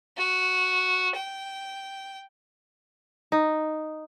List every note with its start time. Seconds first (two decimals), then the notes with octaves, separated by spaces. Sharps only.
0.17 F#4
1.15 G5
3.32 D#4